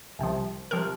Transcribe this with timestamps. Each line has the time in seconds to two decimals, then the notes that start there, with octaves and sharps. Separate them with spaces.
0.19 C2 C3 F3
0.71 C3 F3 A#4